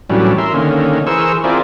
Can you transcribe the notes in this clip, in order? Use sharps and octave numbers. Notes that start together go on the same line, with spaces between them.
A2 E3 F#3 G3 C#4 D4
A#4 E5 C6
D3 D#3 A#3 C#4
E3 G#4 A#4 C5 C#6 E6
C4 E4 F4 G#4 A#4 D5